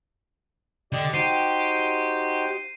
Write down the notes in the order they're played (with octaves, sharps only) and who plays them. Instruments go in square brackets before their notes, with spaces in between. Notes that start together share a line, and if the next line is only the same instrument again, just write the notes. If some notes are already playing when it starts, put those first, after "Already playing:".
[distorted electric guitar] D3 [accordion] G4 D5 D#5
[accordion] D#4 F#4 C5 [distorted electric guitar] G4 [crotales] C7 D#7